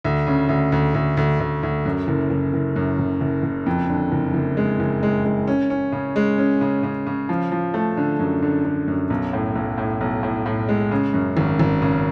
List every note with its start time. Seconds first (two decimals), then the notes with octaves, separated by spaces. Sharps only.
0.04 D2
0.27 C#3
0.49 D2
0.72 D2
0.94 D2
1.17 D2
1.40 D2
1.63 D2
1.85 F#2
2.08 F#1
2.30 F#1
2.54 F#1
2.76 F#2
2.99 F#1
3.21 F#1
3.43 F#1
3.66 F2
3.89 D3
4.12 F#1
4.34 F#1
4.57 G#3
4.80 F#1
5.03 G#3
5.25 G#3
5.48 C#4
5.70 C#4
5.92 C#3
6.16 G#3
6.38 C#4
6.61 C#3
6.83 C#3
7.07 C#3
7.29 F3
7.52 F3
7.74 A3
7.97 D3
8.19 F#2
8.42 D3
8.65 D3
8.88 F#2
9.10 B1
9.33 A2
9.55 B1
9.78 A2
10.01 B1
10.23 A2
10.46 A2
10.69 G#3
10.91 C#3
11.14 F#2
11.37 G#1
11.59 G#1
11.82 C#3